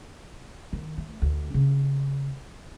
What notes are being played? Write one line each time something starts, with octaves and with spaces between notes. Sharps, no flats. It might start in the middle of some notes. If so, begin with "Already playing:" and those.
D#3
A3
D2
C#3